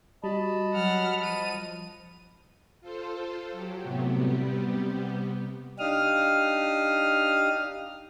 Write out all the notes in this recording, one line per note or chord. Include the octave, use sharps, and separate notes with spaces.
G3 F#4 D#5 A5 B5
F#3 F#5 F6
F3 D#7
F4 A4 C5
F#3 G4
A2 C3 F#3 A3 B3
C3 G3 B3 G4
D4 D#4 G4 F5 D#6 F6